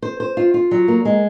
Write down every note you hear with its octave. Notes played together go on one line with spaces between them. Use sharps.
C5
C5
F4
F4
F#3
A#3
G#3